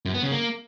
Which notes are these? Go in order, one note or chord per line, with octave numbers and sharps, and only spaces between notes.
F#2
B3
C#3
A#3